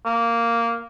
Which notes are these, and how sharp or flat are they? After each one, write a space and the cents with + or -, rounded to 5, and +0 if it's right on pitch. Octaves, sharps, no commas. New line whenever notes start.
A#3 -5